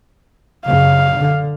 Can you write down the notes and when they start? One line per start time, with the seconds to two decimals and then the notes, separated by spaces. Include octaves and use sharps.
0.67 F#2 C#3 F5
1.18 D3